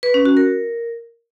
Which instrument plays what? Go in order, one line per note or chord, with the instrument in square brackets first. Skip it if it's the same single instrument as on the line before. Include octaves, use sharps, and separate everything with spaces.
[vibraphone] B4
C#4
F#4
A#4